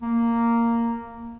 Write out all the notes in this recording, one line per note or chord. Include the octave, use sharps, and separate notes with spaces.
A#3